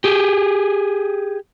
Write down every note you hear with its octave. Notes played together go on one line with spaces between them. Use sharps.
G4 G#4